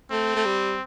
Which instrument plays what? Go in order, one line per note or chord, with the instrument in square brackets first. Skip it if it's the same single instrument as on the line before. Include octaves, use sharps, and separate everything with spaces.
[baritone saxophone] A3 [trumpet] C4
[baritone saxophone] A3
G3